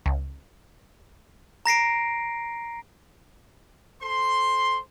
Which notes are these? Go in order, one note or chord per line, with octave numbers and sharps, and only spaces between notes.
C#2
A#5 A#6 C7 D7
A4 C5 C6